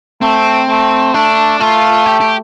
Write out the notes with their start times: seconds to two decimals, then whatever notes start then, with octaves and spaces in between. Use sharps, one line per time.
0.22 A3 C4
0.69 A3
1.14 A3 D4
1.59 A3 F4
2.06 G4
2.21 G4